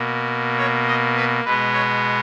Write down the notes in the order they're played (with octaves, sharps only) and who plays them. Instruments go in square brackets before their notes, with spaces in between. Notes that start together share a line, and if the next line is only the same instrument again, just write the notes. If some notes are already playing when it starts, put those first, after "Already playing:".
Already playing: [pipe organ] B2 A#3
C#5
D#5
B4
B2 G#3 B3 B4
C#5